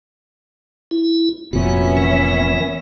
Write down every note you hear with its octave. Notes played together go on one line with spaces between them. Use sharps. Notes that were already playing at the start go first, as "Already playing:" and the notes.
E4
F1 F2 A#2 B3 C#4 F#4 E5
E3 A#4